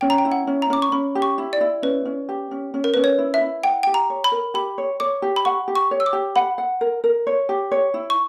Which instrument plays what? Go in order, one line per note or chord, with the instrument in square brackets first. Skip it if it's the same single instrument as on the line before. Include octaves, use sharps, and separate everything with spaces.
[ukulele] C#4 [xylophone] G5
[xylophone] A#5
G5
[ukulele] E4
[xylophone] F#5
[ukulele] C#4
[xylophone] A#5
[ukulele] C#4 [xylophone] D6
[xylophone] C#6
[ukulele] C#4 [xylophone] B5
[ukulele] G4
[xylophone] C#6
[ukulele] E4
[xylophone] D5
[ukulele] E4
[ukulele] C#4 [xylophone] B4
[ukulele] C#4
G4
C#4
C#4
[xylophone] A#4
[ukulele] C#4 [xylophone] B4
[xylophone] C#5
[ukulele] E4
[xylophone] E5
[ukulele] E4
[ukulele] F#5 [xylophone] G5
[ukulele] G4 [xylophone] G5
[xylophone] A#5
[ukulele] C#5
[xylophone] B5
[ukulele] A#4
[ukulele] G4 [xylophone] B5
[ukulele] C#5
[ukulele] C#5 [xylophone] D6
[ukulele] G4
[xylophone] B5
[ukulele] F#5 [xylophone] C#6
[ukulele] G4
[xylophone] C#6
[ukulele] C#5
[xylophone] E6
D6
[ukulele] G4
[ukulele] F#5 [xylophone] B5
[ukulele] F#5
A#4
A#4
C#5
G4
C#5
E4
[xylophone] C#6